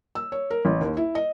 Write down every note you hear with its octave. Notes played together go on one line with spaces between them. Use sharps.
E6
C#5
A#4
A1
D#2
E4
D#5